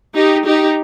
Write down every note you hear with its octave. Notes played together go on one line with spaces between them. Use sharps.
D#4 G4
D#4 G4